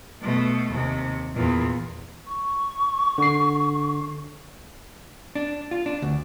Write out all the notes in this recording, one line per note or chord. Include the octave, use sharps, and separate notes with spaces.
B2 A3
D#2 C3
E2 A#2
C#6
D3 C7
D4
F4
D4
D2